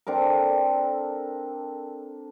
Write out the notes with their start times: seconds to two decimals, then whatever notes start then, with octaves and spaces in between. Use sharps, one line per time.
0.07 C4 D4 A4 A#4